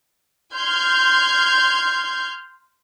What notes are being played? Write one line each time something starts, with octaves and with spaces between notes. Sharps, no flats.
C6 F6 G6 G#6